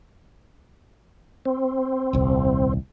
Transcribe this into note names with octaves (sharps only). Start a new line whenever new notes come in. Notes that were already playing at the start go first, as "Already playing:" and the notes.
C4
D#1 C2